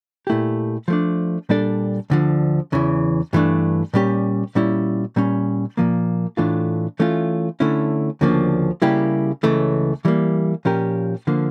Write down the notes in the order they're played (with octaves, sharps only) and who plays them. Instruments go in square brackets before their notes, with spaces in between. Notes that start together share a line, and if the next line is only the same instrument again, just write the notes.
[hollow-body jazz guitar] A#2 A3 E4 G4
F3 A3 D4
A#2 G3 D4 A4 D5
D2 D3 F3
E2 C#3 E3
G2 E3 A3 D4
A#2 G3 C#4 G4
A#2 G3 C#4 E4
A#2 G3 C#4
A#2 F3 A#3
A2 E3 A3 D4 F4
E3 A3 C#4 F4
D3 A3 C#4 E4
D2 C#3 F3 A#3 D4
C#3 G3 A#3 E4 G4
C#2 C#3 E3 A3
E3 G3 A#3
A#2 F3 C#4 G4 A#4
D3 F3 A#3